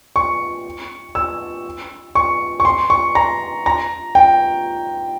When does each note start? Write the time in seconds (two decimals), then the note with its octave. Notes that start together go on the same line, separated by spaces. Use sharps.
0.16 C#6
1.15 E6
2.15 C#6
2.60 C#6
2.65 C6
2.90 C#6
3.15 A#5
3.66 A#5
4.15 G5